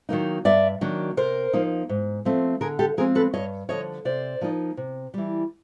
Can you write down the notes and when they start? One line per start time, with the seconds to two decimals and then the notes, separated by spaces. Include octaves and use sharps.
0.09 D#3 F#3 A#3 D#4
0.45 G2 D5 E5
0.81 D#3 F#3 A#3 D4
1.17 C3 A#4 C5
1.53 F3 A#3 D#4
1.89 G#2
2.25 F3 A3 C4
2.61 D3 G#4 A#4
2.79 G4 A4
2.97 F3 G#3 C4 G#4 A#4
3.15 A4 B4
3.34 G2 C#5 D#5
3.69 D3 F3 C#5 D#5
4.05 C3 C5 D5
4.41 F3 A#3 D#4
4.77 C3
5.14 E3 G3